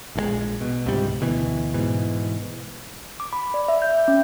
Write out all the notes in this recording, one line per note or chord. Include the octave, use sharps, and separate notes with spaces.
A#1 D3 G#3
B2
C#2 G#2 C3 G3
D2 B2 E3
G#2 B2 E3
D6
B5
D5
E5
G6
C#4